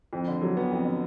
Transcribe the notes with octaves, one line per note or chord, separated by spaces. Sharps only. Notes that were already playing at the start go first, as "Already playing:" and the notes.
F2
D3
F#3
B3
F2
D3